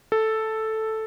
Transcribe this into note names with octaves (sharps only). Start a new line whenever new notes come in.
A4